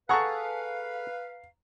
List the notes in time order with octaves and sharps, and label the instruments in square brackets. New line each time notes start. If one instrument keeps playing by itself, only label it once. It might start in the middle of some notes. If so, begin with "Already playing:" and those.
[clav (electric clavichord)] G#4 A4 [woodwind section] B4 F5 [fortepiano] F#5 A#5 C#6